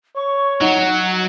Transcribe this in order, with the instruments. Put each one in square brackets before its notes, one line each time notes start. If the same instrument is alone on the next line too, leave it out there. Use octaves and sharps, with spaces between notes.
[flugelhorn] C#5 [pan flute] C#6
[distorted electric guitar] F#3 [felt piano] D#4 [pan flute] F#5